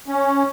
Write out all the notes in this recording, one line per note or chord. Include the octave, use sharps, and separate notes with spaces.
C#4